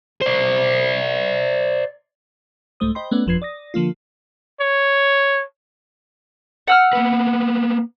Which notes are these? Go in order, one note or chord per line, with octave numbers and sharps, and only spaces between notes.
C5 D5
C2 G#2 A3 C5 D#6
C5 D#5 G5 B5 C6
A3 B3 C#4 B4 D5 F#5
G1 F2 F3 B4 G#6 C7
D5 D#6 A#6
D3 F3 A#3 F4
C#5
F#5 E6 F6
A#3 B3 B4